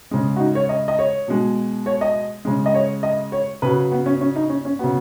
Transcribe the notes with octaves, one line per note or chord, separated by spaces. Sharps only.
C#3 G#3
F#4
D#4
C#5
D#5
D#5
C#5
B2 G#3
C#5
D#5
C#3 G#3
D#5
C#5
D#5
C#5
C#3 F#3 B4
B3
C#4
C#4
D#4
C#4
C#4
C#3 F#3 B3